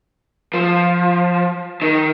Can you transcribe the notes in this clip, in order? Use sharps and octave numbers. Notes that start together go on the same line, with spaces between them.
F3
D#3